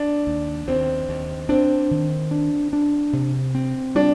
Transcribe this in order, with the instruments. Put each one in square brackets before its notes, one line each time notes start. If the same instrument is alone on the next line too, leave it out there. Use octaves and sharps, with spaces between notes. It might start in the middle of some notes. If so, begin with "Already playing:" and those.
Already playing: [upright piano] D4
[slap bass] D#2
[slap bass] D#2 [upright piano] C4
[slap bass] D#2
[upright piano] C4 [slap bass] D4
[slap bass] D#3
D4
D4
C3
C4
[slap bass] G3 [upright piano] D4